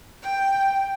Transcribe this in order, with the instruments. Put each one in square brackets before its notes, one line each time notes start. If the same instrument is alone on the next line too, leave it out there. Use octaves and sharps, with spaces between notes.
[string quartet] G5